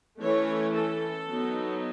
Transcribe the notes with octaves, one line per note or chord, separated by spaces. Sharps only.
E3 A3 C#4 C#5
A4
F#3 B3 D#4